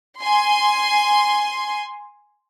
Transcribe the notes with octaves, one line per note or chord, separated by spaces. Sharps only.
G#5 C6